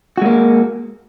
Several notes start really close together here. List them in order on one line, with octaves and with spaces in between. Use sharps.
F#4 G#3 A#3